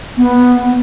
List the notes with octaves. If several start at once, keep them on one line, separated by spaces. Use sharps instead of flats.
B3